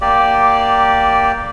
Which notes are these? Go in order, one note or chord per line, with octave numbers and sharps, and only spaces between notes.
A#3 G4 D5